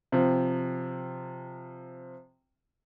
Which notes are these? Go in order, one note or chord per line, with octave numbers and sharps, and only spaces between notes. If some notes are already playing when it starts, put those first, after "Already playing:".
C3 F3